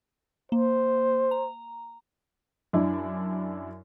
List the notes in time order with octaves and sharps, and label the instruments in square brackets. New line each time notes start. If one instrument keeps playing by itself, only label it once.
[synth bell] A#3 [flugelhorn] C5
[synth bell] A#5
[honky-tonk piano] F#2 D4 E4